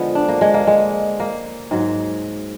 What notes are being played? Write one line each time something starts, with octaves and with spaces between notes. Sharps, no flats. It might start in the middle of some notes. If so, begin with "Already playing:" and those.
Already playing: D3 F3 G#3 B3
D4
A#3
G#3
A#3
G#3
A#3
G#2 F#3